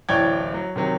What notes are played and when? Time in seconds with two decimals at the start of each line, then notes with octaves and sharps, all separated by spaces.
0.09 D1 A1 C#5 D5 G5 G#6
0.54 F#3
0.76 C3 D#3 F#3